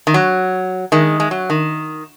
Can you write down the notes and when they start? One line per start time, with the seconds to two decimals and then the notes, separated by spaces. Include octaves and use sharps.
0.07 D#3
0.14 F#3
0.92 D#3 G#3
1.20 G#3
1.31 F#3
1.50 D#3